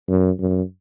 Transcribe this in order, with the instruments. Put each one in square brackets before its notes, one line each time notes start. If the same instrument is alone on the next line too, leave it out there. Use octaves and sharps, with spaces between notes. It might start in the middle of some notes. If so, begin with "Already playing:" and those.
[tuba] F#2
F#2